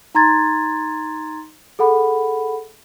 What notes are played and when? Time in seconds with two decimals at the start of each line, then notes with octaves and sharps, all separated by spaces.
0.15 D#4 A#5 C6 G#6 A6
1.79 G#4 A4 F#5 B5